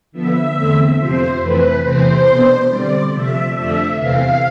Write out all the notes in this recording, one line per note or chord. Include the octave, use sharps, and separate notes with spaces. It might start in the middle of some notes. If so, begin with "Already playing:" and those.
D3 F3 B3 E5
E2 D3 A3 C4
F2 C3 F3 C5
F2 E3 A3 C4 B4
E2 C3 E3 A3 C4 C5
B2 B3 D4
D3 G3 C4 D5
C3 F3 A3 E5
F2 D3 F3 A3 D4 E5
E2 C3 E3 A3 C4 F5